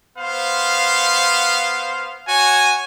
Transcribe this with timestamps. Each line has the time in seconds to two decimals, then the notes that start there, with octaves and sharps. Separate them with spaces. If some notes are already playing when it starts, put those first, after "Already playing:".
0.17 B3 C5 F5
2.28 F#4 C#5 G#5